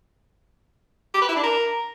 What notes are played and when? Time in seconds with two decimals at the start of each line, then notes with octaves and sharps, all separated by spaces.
1.14 G4
1.22 B4
1.29 E4
1.36 D4
1.44 A#4